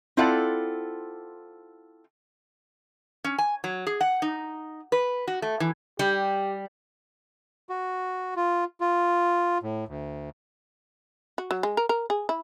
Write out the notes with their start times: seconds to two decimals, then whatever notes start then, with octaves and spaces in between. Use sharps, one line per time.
0.17 C4 E4 F4 A4 D5 F#5
3.24 C#4
3.38 G#5
3.64 F#3
3.87 G#4
4.01 F#5
4.22 D#4
4.92 B4
5.28 F#4
5.42 A3
5.60 E3
5.99 G3 G4
7.69 F#4
8.36 F4
8.81 F4
9.63 A2
9.88 D2
11.38 F#4
11.51 F#3
11.63 G#3
11.77 A#4
11.89 A#4
12.10 G#4
12.29 E4